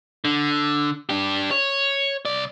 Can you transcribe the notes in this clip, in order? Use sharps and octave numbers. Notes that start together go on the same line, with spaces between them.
D3
D4 G4
C#5
C2 D5